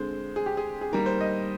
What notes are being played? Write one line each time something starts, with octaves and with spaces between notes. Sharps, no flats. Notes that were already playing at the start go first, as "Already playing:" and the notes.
Already playing: D3 G#3 C4 C5
G#4
G4
G#4
G#4
D#3 G3 A#3 A#4
C5
D#5